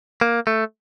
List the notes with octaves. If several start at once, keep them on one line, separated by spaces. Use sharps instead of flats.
A#3
A3